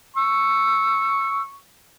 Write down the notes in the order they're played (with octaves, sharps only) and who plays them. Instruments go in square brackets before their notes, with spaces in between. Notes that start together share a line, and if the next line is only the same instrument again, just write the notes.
[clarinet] C#6 [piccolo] E6